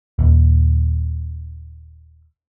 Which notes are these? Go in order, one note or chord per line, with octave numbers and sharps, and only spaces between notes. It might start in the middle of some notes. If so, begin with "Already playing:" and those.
D#1 D#2